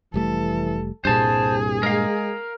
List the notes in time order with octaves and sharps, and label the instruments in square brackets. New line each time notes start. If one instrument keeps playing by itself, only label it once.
[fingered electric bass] F1 G3 A3 [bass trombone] E3 [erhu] A4
[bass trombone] C2 [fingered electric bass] G2 A#2 [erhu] G#4 [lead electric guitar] C5 A5
[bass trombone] G#3 [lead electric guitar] A#4 F5